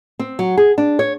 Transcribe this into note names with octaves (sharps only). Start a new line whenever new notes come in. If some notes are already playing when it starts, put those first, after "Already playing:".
C4
F#3
G#4
D4
C#5